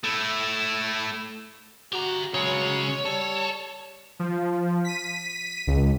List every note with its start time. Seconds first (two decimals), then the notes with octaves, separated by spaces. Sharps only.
0.04 A3 E4
1.93 F#4 G4 A#5
2.34 C#3 F#3 G#3 C#5
3.05 G3 A4
4.19 F3
4.85 B6 D#7
5.67 C#2